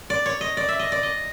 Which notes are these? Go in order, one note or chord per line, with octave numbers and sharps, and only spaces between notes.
D5
C#5
D#5
D5
E5
D#5
D5
D#5